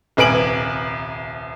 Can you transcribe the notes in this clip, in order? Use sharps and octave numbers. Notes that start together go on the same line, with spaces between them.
D#1 C2 B4 G#5 D7 F#7